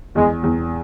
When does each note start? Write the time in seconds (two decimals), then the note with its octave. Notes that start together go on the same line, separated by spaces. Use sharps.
0.15 E2 G#3
0.43 E2